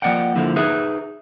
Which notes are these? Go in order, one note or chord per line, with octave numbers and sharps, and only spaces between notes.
F3 A#3 D5 D#5 F#5 G5
D3 F3 A#3 E4
D#4 G#4 B4 E5